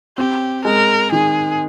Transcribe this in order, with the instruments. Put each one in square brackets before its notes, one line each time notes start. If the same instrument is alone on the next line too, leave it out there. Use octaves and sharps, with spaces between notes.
[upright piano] C4 [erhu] G4
[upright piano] G#3 [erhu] A#4
[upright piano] D#3 [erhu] G#4